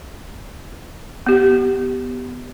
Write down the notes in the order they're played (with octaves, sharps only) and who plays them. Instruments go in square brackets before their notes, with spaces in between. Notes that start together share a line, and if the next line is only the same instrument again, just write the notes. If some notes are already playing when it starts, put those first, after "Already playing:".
[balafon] B3 G4